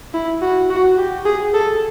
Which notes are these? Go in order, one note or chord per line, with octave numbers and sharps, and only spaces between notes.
E4
F#4
F#4
G4
G#4
A4